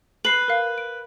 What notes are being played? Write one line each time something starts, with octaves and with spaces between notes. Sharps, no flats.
B4 C7 F#7
A#4 F5
D7